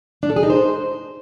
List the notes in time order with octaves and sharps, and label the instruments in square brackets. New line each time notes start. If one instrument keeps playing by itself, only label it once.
[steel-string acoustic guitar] D4
A4
G#4
D#4
C5